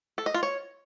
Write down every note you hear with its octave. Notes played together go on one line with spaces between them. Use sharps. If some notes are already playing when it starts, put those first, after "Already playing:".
A4
D#5
F4
C#5